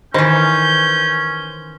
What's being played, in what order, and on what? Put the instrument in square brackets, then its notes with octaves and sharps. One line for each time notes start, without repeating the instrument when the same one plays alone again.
[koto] D#3 E3 [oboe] C#4 [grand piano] C5 [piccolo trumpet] G6